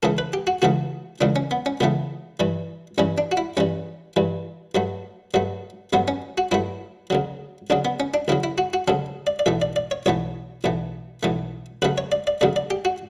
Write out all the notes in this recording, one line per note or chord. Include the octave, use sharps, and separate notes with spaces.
C#2 C#3 E3 A3 A4
B4
G4
F#4
C#2 C#3 E3 A3 F#4
C#2 C#3 E3 A3 D4
C#4
B3
C#4
C#2 C#3 E3 A3 B3
G2 E3 G3
G2 E3 G3 C#4
D4
F#4
E4
G2 E3 G3 C#4
G2 E3 G3
G2 F#3 A3
G2 F#3 A3
G2 F#3 A3 B3
C#4
F#4
G2 F#3 A3 E4
D2 C#3 F#3
D2 C#3 F#3 D4
B3
C#4
D4
D2 C#3 F#3 E4
E4
F#4
F#4
D2 C#3 F#3 A4
D5
D5
B1 A2 E3 A3 E5
D5
D5
C#5
B1 A2 E3 A3 C#5
B1 A2 E3 A3
B1 A2 E3 A3
D2 C#3 F#3 A3 B4
C#5
D5
D5
D2 C#3 F#3 A3 D5
D5
G4
F#4